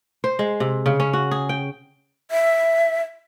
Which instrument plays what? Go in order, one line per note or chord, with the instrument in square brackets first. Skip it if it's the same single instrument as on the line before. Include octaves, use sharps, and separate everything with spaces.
[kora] C5
G#3
C3
C#3
C#4
F#4
G#4
G5
[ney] E5